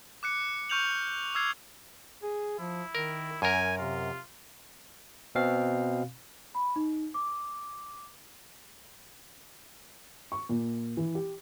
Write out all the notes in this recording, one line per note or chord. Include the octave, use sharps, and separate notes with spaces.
D6 F#6 C#7
C#6 F6 G6 C#7 F7 F#7
D6 E6 F6 G#6 C7
G#4
F3 E4
D#3 A#4
F#2 A#4 G#5
C3 F4
B2 C4 F5
B5
D#4
D6
C#6
A#2
E3
G4